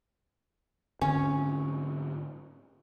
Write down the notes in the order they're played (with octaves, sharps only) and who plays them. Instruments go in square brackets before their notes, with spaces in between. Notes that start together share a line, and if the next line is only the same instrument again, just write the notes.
[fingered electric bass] G#2 D3 C4 [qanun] C#4